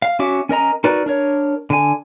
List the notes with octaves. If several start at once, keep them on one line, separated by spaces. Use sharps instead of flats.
F5
C#4 F#4 E5 D6
C#4 A#4 D#5 A#5
D#4 F#4 A#4 B4 D5
D4 A#4 C#5
D3 G#5